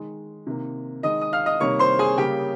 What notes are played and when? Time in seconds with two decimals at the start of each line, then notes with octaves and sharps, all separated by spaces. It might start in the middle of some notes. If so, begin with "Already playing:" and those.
Already playing: D#3 G#3
0.47 C3 D#3 A#3
1.03 D#3 G#3 D#5 D#6
1.21 D#6
1.33 F5 F6
1.46 D#5 D#6
1.60 C3 D#3 G3 A#3 C#5 C#6
1.79 C5 C6
1.99 G#4 G#5
2.17 C#3 G3 A#3 G4 G5